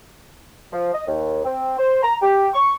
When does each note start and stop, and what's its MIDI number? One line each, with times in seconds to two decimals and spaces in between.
0.72 0.89 53
0.93 1.05 75
1.07 1.42 39
1.44 1.74 60
1.78 1.99 72
2.03 2.14 82
2.21 2.48 67
2.54 2.73 85